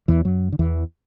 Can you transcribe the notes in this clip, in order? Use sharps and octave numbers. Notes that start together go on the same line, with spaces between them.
E2 E3
F#2 F#3
D3
E2 E3